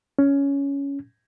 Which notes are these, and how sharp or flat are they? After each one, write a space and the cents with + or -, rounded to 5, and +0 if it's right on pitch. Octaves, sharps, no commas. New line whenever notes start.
C#4 +10